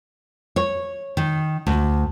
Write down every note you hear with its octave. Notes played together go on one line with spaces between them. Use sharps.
C#5
D#3
D2